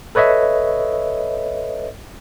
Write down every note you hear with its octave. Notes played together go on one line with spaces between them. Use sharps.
A4 B4 C#5 D#5 E5